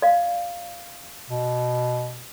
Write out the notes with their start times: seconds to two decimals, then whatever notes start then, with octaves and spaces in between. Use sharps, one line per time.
0.02 D5 F5
1.30 B2